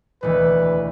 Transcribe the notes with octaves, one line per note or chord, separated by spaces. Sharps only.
E1 D2 E3 B4